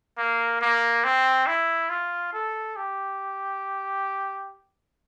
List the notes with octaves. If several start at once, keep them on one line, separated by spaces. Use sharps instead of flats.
A#3
A#3
C4
E4
F4
A4
G4